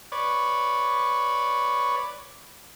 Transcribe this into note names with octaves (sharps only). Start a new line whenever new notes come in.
B4 C#5 D5